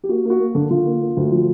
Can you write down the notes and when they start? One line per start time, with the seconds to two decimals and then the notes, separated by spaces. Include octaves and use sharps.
0.04 G4
0.09 A#3 F#4
0.25 A#3
0.30 F#4
0.40 A#3
0.55 D3
0.70 D3 F4
0.86 A#3
1.01 A#3
1.17 D2
1.31 F3